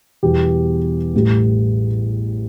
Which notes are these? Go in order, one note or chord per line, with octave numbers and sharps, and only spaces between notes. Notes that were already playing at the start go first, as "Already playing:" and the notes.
E2 B2 G3 G4
A1 A2 G3